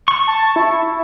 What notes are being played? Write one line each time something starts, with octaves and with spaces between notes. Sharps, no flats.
C#6
A5
E4